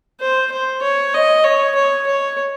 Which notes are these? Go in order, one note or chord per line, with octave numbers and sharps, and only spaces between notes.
C5
C5
C#5
D#5
C#5
C#5
C#5